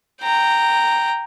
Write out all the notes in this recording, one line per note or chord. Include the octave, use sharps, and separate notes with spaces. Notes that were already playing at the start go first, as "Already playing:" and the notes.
G5 A#5